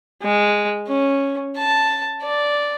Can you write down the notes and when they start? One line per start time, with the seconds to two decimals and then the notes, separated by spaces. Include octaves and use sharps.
0.23 G#3
0.87 C#4
1.57 A5
2.22 D5